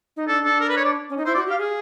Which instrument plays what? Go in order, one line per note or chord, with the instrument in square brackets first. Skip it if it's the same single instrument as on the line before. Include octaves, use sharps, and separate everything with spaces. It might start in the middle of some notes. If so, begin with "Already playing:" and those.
[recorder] D#4
[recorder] D4 [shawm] A4
[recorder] D4 [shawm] A4
[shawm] A#4
B4
C#5
D5
[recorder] C#4
D#4
[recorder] E4 [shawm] C5
[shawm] D5
[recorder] F#4
[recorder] G4 [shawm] F5
[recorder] G#4